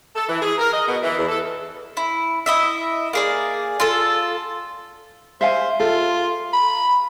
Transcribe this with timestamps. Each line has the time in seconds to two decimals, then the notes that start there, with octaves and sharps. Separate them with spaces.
0.16 A4
0.29 E3
0.42 G#4
0.58 A#4
0.73 D#5
0.88 B2
1.03 E3
1.18 E2
1.29 A4
1.97 E4
2.46 E4 D#5 E5
3.13 A#3 G#4 D5
3.80 F4 A4
5.41 C5 E5 F5 G#5
5.80 F4 A4
6.53 B5